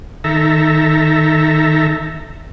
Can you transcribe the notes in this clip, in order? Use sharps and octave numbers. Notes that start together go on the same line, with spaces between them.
D#3 A4 E5 A#5